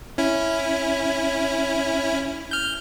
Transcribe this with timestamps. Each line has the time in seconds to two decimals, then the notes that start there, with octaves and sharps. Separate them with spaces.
0.18 C#4 E4
2.51 F6 G6